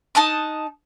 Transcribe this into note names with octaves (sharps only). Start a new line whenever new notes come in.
D#4 A5 D#6 F#6